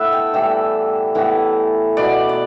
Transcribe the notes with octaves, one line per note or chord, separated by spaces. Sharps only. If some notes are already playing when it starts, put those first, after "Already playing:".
Already playing: A2 A3 B3 A4 B4 E5
G5
A2 E3 G3 E5
A2 E3 B3
B2 B3 D5
D5